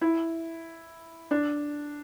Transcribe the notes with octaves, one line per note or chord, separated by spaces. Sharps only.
E4
D4